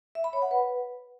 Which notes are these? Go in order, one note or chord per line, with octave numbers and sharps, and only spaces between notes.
E5
B5
C#5
F#5
B4